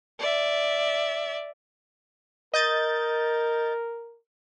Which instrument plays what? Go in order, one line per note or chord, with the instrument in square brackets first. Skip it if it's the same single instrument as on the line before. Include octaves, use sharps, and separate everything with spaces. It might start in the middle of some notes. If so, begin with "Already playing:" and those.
[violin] D5 E5
[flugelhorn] A#4 [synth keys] D#5 G6 A6